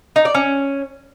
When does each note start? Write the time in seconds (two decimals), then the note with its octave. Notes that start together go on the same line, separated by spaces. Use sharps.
0.16 D#4
0.25 D5
0.35 C#4